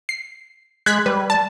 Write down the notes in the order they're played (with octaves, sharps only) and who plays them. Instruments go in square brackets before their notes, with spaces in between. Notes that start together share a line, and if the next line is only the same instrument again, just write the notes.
[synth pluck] C7
[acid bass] G#3 [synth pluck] F#6 G#6 B6
[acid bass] G3 [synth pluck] B4
[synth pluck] A5